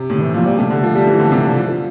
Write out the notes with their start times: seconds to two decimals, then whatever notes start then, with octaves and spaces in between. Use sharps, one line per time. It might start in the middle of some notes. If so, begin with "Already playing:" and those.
Already playing: C3
0.10 A2
0.13 D3
0.21 E3
0.34 A#2 F3
0.46 G3
0.59 C3 A3
0.70 D3
0.83 F3
0.95 G3
1.07 E3
1.20 D3
1.32 C3
1.44 D3
1.56 F3
1.69 F3